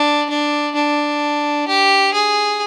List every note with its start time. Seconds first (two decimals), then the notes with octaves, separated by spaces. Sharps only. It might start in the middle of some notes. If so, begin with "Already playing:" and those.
Already playing: D4
0.29 D4
0.75 D4
1.68 G4
2.13 G#4